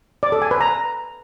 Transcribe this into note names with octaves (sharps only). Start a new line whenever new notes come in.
D5
A4
G#5
B4
A#5